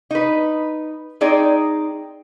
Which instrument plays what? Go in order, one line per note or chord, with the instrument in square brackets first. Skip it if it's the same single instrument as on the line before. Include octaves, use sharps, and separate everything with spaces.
[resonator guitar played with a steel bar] D#4 B4
C4 D#4 G#4 D5